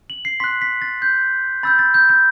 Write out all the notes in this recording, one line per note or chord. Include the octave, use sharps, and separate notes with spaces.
F#7
C7
C6 F#6 B6
B6
A6
G6
B5 E6 G6 A6
A6
G6
G6